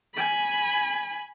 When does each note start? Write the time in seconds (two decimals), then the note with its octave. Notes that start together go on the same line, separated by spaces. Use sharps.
0.14 G#5 B5